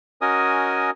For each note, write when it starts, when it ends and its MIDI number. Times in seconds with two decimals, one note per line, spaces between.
0.22 0.90 61
0.22 0.90 66
0.22 0.90 70
0.22 0.90 75
0.22 0.90 80
0.22 0.90 87